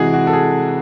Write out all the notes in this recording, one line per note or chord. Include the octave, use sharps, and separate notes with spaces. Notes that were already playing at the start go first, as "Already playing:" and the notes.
Already playing: C3 E3 G#3 F#4 G#4
F#4
A4
G#4